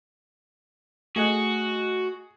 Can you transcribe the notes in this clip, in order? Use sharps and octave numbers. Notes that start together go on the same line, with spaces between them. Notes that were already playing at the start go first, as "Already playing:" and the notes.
A3 F#4 G#4 D#5 F#6